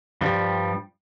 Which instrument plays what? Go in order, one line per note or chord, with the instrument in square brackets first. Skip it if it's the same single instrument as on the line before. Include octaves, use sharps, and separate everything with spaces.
[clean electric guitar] G2 F3 G3